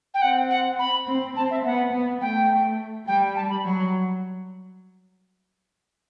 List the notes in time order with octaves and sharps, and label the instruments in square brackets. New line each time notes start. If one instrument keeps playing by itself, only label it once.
[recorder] G5
[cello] C4 [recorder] F#5
[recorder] F#5
B5
[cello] C4
[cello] C4 [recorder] A5
[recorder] E5
[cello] B3 [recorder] F#5
[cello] B3
[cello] A3 [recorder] G5
[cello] G3 [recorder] G5
[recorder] A5
B5
[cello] F#3